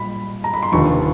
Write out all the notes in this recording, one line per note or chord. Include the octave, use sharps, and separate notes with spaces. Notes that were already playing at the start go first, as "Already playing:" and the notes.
Already playing: A#2 G3 B5
A#5
B5
C6
F1 D#2 D3 F3 C#6